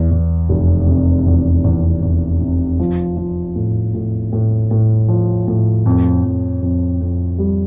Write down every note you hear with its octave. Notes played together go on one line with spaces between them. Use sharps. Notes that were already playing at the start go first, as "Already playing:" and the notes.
Already playing: E2
E2
F1
C3
E2
E2
E2
C3
F3
F3
A2
A2
A2
A2
F3
A2
F2
F2
F2
F2
G3